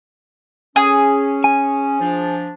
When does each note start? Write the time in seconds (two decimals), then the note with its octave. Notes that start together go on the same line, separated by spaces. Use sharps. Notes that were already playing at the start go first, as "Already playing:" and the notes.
0.76 C#4 G#4
1.44 G#5
2.00 F3 D4